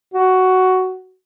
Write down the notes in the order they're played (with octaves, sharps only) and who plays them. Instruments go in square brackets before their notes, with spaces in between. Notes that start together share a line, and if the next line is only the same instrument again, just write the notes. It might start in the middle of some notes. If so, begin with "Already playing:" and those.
[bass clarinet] F#4